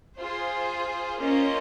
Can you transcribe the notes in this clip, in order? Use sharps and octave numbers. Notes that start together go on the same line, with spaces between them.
F4 G#4 C5
A#3 C#4 F4 C5 D#5